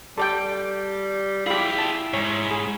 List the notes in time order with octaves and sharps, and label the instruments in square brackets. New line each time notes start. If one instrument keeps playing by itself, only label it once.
[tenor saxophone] G3 [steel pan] A4 D5 G5
[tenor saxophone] E4 [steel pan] F4 G4 [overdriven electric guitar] G#4 G5
[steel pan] A5
[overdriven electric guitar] G#2 [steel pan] C#5
[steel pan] G#4